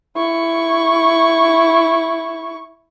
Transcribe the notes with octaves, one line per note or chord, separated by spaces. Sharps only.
E4 C#6